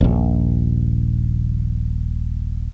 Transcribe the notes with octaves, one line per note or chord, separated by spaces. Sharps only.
D#1 A#1